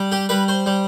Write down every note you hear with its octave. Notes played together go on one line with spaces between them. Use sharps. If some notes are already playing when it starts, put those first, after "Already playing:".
Already playing: G3
G4
G3 B4
C5
G3